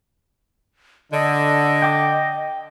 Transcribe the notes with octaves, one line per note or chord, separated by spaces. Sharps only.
D3 D#5
G5 D6